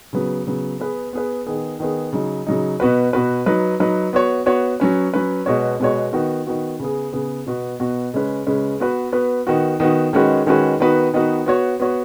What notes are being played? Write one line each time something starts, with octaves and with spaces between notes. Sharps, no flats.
C#3 F#3 B3
C#3 F#3 B3
B3 G#4 B4
B3 G#4 B4
D#3 B3 G#4
D#3 B3 G#4
C#3 F#3 D#4
C#3 F#3 D#4
B2 B3 F#4 B4
B2 B3 F#4 B4
F#3 D#4 B4
F#3 D#4 B4
B3 F#4 C#5
B3 F#4 C#5
F#3 C#4 B4
F#3 C#4 B4
B2 G#3 B3 F#4 C#5
B2 G#3 B3 F#4 C#5
D#3 B3 F#4
D#3 B3 F#4
C#3 B3 G#4
C#3 B3 G#4
B2 B3 F#4
B2 B3 F#4
C#3 G#3 C#4 B4
C#3 G#3 C#4 B4
B3 F#4 B4
B3 F#4 B4
D#3 B3 F#4
D#3 B3 F#4
D#3 G#3 C#4 F#4 B4
D#3 G#3 C#4 F#4 B4
D#3 B3 D#4 F#4 B4
D#3 B3 D#4 F#4 B4
B3 F#4 C#5
B3 F#4 C#5